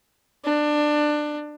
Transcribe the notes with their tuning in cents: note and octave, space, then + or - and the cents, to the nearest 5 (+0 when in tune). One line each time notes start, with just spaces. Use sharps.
D4 +20